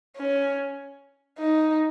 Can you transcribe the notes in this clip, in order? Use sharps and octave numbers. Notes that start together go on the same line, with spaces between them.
C#4
D#4